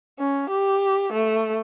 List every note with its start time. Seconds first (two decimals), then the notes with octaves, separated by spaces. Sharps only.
0.19 C#4
0.50 G4
1.13 A3